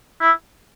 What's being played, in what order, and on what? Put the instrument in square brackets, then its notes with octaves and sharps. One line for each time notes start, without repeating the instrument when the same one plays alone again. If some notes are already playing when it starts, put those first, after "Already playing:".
[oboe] E4